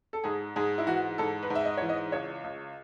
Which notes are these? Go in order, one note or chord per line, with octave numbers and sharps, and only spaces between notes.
A4
G#2 G#4
G#2 G#4
E4
E3 F#4
G#2 A4
B4
G#2
E5
D#5
E3 C#5
D#5
C#2 C#5
C#2